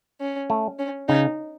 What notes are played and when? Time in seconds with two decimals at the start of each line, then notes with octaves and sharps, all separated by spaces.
0.21 C#4
0.50 A3
0.79 C#4
1.08 C#3 D#4